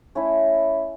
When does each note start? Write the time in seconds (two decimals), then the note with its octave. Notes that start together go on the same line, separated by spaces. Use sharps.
0.15 A3 C#4 E4